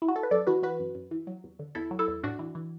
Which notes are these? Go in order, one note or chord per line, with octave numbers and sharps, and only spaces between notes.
E4
F#4
A4
B4
F#2 A4 D5
E3 F#4 B4
E3 F#4 B4
F#2
F#2
E3
F#3
E2
D3
E2 E4 A4
F#3
E4 A4
E2
A2 D4 F#4
E3
E3